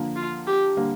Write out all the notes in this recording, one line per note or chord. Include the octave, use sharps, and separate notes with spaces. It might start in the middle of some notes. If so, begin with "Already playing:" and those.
Already playing: D3 F3 A#3
F4
G4
D3 G3 A#3